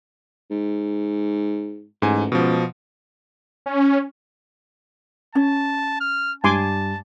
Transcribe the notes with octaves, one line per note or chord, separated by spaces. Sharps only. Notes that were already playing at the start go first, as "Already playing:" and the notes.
G#2
A1 G#2 G#5
C#2 B2 F3
C#4
C#4 A5
F6
G2 G#5 A5 C6 D6